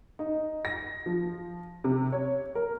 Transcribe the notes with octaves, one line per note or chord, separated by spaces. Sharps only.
D#4
A#6
F3
C3
C#5
A#4